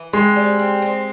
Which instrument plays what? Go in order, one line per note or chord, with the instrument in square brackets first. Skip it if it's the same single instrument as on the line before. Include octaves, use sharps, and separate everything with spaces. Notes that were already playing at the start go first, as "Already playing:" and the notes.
Already playing: [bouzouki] E3
[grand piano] G#3 [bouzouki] C4
[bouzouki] G3
C4
C4